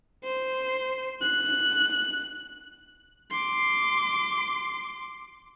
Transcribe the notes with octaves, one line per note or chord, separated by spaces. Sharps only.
C5
F#6
C6 D6